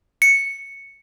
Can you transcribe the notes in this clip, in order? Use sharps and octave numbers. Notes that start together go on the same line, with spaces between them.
C#7